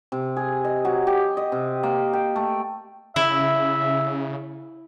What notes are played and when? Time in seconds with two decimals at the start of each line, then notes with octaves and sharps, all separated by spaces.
0.12 C3
0.36 G#4
0.64 D#5
0.85 F#3
1.07 G4
1.37 D#5
1.52 C3
1.83 A#3
2.13 G5
2.36 A3
3.16 C#3 E4 E5